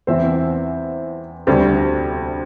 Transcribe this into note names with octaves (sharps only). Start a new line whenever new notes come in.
E2 E3 C4 C5 E5
D2 C3 G3 C4 G4 C5